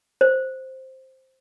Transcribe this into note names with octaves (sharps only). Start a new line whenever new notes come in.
C5